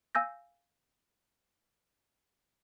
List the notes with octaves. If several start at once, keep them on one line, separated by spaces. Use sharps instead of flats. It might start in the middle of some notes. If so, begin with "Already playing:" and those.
F5 G#5 E6 G6 A#6